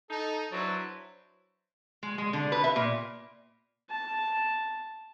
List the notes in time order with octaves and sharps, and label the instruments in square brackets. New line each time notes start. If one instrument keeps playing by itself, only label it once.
[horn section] D#4 [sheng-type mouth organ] A4
[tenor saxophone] F#3 [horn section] D4 E4 B4 [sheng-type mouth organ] C5
[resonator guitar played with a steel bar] G#3
G#3
D3
B4
E5
A#2
[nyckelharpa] A5